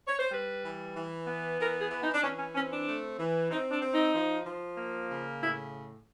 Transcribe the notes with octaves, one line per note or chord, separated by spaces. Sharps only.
C#5
C5
G3 B4
E3
E3
B3
E3 A#4
G#4
E3
D#4
D4
E3 C#4
C#4
C4 C#4
D4
A3
E3
C4 D#4
D4
C4
D#4
F3
F3
A#3
C#3
A2 E4